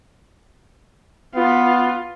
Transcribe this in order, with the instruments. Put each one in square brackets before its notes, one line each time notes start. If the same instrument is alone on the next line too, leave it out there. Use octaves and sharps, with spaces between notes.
[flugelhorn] B3 [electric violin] F4